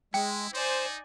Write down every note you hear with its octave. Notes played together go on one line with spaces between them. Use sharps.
G#3 E4 G5
D#4 C5 D5 G#5